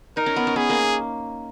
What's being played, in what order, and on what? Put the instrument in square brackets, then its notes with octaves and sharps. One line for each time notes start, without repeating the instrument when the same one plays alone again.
[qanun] D#4 [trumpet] A#4
[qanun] C#4
B3
C#4
[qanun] B3 [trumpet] G#4
[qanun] A#3